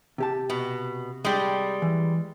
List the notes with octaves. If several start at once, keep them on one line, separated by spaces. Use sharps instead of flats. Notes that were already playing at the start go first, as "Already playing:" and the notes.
C3 G4 A5
B2
G3 G#3
E3